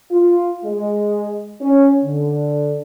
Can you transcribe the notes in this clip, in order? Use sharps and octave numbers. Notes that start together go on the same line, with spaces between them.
F4
G#3
C#4
D3